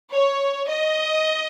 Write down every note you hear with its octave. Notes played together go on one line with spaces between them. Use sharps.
C#5
D#5